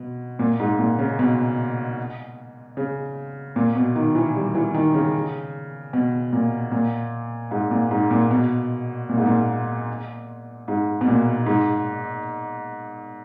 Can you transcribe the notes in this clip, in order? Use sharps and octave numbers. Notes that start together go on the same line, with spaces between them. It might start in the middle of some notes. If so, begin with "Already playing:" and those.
Already playing: B2
A#2
G#2
A#2
C#3
B2
C#3
A#2
B2
D#3
E3
G3
E3
D#3
C#3
B2
A#2
A#2
G#2
A#2
G#2
A#2
B2
A#2
G#2
A#2
G#2
B2
A#2
G#2